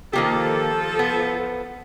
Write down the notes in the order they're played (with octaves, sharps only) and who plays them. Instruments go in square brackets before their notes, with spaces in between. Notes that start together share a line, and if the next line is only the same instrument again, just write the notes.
[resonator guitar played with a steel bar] D#3 A#3 G4 [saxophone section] F3 A4
[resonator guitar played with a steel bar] B3